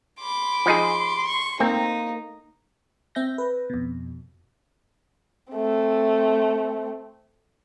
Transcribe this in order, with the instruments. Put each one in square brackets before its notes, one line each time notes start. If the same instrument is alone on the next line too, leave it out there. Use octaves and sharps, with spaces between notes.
[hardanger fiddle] B5 D6 [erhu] C6
[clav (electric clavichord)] F3 D#4 G#4
[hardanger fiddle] C#6
[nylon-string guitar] A#3 [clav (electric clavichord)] C4 [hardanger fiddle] D#4
[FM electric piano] C4 E5 G6 A#6
B4
F2 B2
[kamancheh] A3 C4